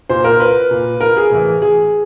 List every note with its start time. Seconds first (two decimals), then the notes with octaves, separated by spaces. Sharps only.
0.09 A#2 C5
0.24 A#4
0.40 B4
0.71 A#2
1.01 A#4
1.17 G#4
1.31 A2 E3
1.62 G#4